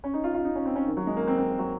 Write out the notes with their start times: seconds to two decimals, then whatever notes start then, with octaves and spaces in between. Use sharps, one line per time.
0.04 C#4
0.14 D#4
0.24 F4
0.34 F4
0.45 D#4
0.56 C#4
0.65 C4
0.76 C#4
0.86 D#3
0.97 F#3
1.07 G#3
1.17 A#3
1.27 C4
1.38 C4
1.49 A#3
1.59 F#3